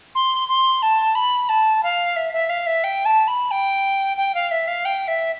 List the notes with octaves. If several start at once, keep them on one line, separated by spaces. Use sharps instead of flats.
C6
C6
A5
B5
A5
F5
E5
E5
F5
E5
G5
A5
B5
G5
G5
F5
E5
F5
G5
E5